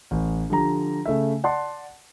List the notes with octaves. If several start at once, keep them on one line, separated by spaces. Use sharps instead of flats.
A1
D3 F3 G4 A#5
C#3 A3 E5
D5 F#5 A5 C6